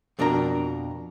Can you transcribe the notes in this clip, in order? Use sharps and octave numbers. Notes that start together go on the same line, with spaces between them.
F2 B2 D4 A#4 A#5